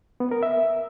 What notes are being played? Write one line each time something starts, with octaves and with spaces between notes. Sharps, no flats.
B3
A#4
E5